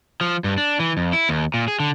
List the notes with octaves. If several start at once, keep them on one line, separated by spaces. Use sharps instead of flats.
F3
G2
D4
E3
F2
E4
D#2
A#2
G#4
D3